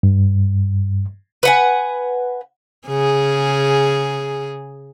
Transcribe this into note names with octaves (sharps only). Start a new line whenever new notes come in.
G2
B4 F#5 G#5
C#3 G#4